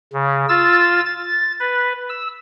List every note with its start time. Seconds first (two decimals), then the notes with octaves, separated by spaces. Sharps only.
0.13 C#3
0.49 F4 E6 A6
1.06 A6
1.60 B4
2.09 E6